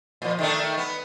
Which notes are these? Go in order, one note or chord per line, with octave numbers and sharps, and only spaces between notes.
A#2 F3
D#3 A3 D4
B3